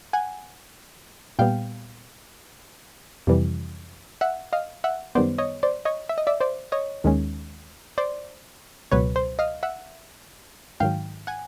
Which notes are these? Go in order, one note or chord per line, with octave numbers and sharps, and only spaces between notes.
F#5 G#5
A#2 G3 B3 F5 G5
F2 C3 E3 G3
E5 F#5
D#5 F5
E5 F#5
F#2 D#3 G3 B3 C5 D5
C#5 D#5
C5 D5
C#5 D#5
E5
D#5
D5 E5
C5 D5
C#5 D#5
D#2 D#3 G#3 C#4
C5 D5
C#2 B2 F#3 B4 C#5
C5
D#5 F5
E5 F#5
G#2 D#3 F#3 F5 G5
F#5 G#5